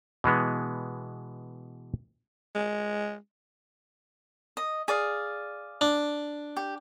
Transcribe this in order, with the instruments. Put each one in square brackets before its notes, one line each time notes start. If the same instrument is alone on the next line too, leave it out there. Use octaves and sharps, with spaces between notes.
[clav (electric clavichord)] B2 E3 G#3 B3
[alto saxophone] G#3
[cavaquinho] D#5
G#4 D5 F5
[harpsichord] D4
[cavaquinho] G4